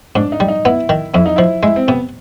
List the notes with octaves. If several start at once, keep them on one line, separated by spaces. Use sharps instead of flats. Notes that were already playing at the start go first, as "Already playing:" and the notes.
G#2 D4
D#4
G3
D#4
B3 E4
D#3
F2 E4
D#4
F3 E4
G#3 E4
C4
C3 B3